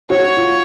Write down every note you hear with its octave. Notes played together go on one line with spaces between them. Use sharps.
F#4 C#5
F4